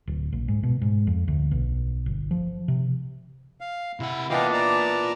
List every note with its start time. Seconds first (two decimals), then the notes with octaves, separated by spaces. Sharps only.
0.07 D1
0.33 A#1
0.48 G#2
0.63 B2
0.82 G#2
1.07 F2
1.28 D2
1.51 B1
2.06 G1
2.31 F3
2.68 C3
3.61 F5
4.00 C3 E4 F#5
4.30 E3 B3 D4 F4 A#4 D#5 F5 G5
4.53 D5 A5 A#5